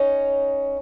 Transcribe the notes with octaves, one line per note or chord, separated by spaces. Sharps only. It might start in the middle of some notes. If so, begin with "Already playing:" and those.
Already playing: C#4 D#4